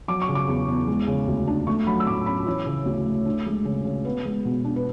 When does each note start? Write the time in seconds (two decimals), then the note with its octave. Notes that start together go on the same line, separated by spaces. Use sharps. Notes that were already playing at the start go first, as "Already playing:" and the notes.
0.08 F#3 D6
0.22 C#6
0.29 C#3
0.35 D6
0.48 E2
0.68 E2
0.88 G#3
1.07 C#3
1.28 D2
1.47 D4
1.67 A3 C#6
1.86 F#3 B5
2.00 E6
2.07 A2 D6
2.26 C#4 B5
2.46 E3 C#5
2.66 C#3
2.86 D2
3.06 A3
3.25 D4
3.46 G#3
3.65 C#3
3.85 C#3
4.05 B3 B4
4.25 G#3
4.45 B2
4.65 D4
4.76 B4